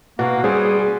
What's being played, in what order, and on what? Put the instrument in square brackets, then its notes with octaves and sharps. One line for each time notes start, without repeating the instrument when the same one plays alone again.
[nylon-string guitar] B2 [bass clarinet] A#3 [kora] F#4
[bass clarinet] G3 [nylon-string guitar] C4 C5 [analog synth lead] G#4